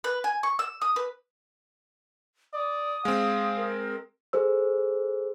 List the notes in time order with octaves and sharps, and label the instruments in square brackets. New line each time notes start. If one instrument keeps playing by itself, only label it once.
[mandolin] B4
G#5
C#6
E6
D#6
B4
[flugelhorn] D5 [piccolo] D#6
[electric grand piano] G#3 C4 [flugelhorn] F5
[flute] A#4
[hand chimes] G#4 A4 C5 E6